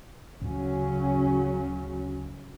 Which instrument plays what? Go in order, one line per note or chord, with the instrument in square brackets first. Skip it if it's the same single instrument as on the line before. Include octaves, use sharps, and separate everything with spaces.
[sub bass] D2 [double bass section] C#3 F#3 C#4